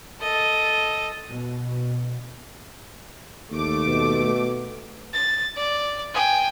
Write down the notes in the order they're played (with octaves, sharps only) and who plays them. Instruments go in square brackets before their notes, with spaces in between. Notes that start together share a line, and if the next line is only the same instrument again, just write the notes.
[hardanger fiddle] A4 D#5
[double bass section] B2
[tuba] D#2 [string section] A3 D6
[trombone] B2
[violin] A6
D5
G5 G#5